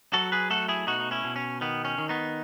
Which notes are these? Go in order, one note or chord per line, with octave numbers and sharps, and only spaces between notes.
F#3 F#4 A4
G#4 B4
A3 F#4 A4
E4 G#4
B2 D#4 F#4
D#4
C#4 E4
B2
C#4
D#3 B3
C#4
D#3
B3 D#4